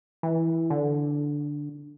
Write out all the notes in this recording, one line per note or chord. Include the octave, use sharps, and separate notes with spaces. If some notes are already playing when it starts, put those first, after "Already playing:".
E3
D3